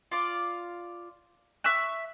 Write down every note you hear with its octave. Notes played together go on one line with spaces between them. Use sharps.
F4 D5
E5 C#6 E6 F#6